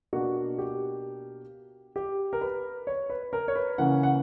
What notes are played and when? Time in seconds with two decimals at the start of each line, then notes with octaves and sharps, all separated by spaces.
0.13 B2 A#3 D4 F#4
0.59 G4
1.96 G4
2.33 A#4
2.41 B4
2.87 C#5
3.10 B4
3.33 A#4
3.48 C#5
3.56 B4
3.78 C#3 E3 A#3 C#4 F#5
4.03 F#5